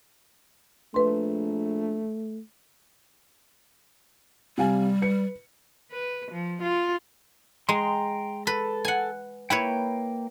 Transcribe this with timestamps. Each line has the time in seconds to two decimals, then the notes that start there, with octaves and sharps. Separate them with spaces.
0.94 A#1 A3 B4 C6
4.58 C3 G3 F5 G#5
5.02 B4 C#7
5.91 B4
6.32 F3
6.62 F4
7.69 G#3 G5 A#5 C6
8.47 A4 B4
8.85 F#5 G#5
9.50 A#3 E4 B4 C#5 G5